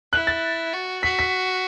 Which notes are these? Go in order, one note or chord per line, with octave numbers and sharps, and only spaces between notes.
E4 F#6
A6
F#4
F#4 B6
B6